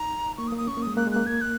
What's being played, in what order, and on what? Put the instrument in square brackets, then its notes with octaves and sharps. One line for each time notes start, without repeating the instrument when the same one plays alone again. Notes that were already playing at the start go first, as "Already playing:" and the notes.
Already playing: [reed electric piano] D#4 [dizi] A#5
[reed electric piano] A#3 [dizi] C#6
[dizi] D#6
[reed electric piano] A#3
[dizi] D#6
[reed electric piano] C#4 [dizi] C#6
[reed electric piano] A#3
[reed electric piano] G#3 [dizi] D#6
[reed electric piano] A#3 [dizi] F#6
[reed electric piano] G#3
[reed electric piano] A#3 [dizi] F#6
[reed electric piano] A#3 [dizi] G#6
[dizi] F#6